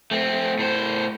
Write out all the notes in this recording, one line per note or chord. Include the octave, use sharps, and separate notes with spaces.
A3 C4
A2 C5